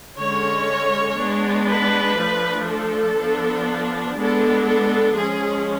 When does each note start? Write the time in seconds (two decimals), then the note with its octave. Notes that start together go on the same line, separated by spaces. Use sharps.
0.18 D3 G#3 C#4 C#5
1.18 G#3 B3 D4
1.68 B4
2.17 F3 A3 D4
2.68 A4
3.18 F3 B3 D4
4.18 G#3 B3 D4 A4
4.66 A4
5.16 F3 G#3 C#4 G#4